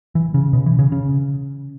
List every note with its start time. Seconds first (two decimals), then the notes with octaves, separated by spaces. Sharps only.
0.15 E3
0.34 C#3
0.53 B2
0.66 E3
0.79 C#3
0.92 C#3